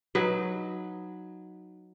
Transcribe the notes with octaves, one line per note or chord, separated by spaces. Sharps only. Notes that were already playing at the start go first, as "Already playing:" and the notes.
F#3 D#4 B4